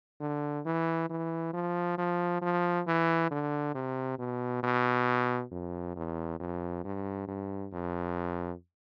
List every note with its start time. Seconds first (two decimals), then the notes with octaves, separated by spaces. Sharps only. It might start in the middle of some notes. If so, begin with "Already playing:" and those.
0.21 D3
0.66 E3
1.10 E3
1.53 F3
1.98 F3
2.42 F3
2.87 E3
3.31 D3
3.74 C3
4.19 B2
4.63 B2
5.51 F2
5.96 E2
6.40 F2
6.84 G2
7.28 G2
7.73 F2